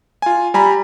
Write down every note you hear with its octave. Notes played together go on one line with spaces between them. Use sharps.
F4 G#5
G3 G#5 A#5 B5